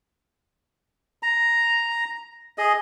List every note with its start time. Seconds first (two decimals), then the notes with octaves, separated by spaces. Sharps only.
1.23 A#5
2.58 G#4 D#5